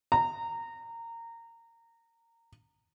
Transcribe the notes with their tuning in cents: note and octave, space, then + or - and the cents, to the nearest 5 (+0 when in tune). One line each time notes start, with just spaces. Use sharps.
A#5 -20